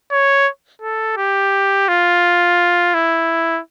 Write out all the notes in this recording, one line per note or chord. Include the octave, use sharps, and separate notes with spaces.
C#5
A4
G4
F4
E4